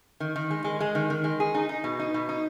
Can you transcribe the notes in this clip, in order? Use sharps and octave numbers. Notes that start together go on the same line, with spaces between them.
D#3
D#3
G#3
G#3
G#3
D#3
D#3
G#3
G#4
D#4
D#4
B2
D#4
B2
D#4